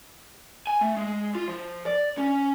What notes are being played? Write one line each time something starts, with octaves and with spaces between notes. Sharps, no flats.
G#5
A3
G#3
F4
F3
D5
C#4